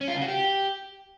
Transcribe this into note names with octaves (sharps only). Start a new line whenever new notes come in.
C#4
F4
C#3
F#4
G4